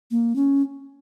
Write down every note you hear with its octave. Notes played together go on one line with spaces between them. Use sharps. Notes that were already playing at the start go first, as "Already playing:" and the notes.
A#3
C#4